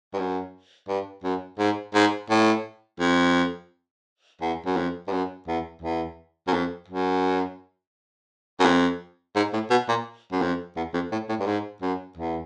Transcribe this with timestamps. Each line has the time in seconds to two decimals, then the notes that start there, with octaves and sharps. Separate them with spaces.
0.14 G2
0.19 F#2
0.88 G2
1.24 F#2
1.59 G#2
1.95 G#2
2.30 A2
3.00 F2
4.41 E2
4.66 F#2
4.77 F2
5.08 G2
5.12 F#2
5.48 E2
5.82 E2
6.47 F#2
6.53 F2
6.88 F#2
8.60 F#2
8.65 F2
9.36 G#2
9.53 A2
9.70 B2
9.89 A#2
10.32 F#2
10.42 F2
10.77 E2
10.94 F2
11.12 A2
11.29 A2
11.40 G2
11.47 G#2
11.82 F#2
12.17 E2